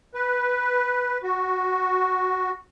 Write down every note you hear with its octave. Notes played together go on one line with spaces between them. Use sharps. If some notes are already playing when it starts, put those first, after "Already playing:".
B4
F#4